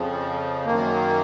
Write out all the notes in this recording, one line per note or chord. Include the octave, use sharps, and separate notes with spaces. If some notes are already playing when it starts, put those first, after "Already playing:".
Already playing: F2 C#3 F3
F#2 D#3 A#3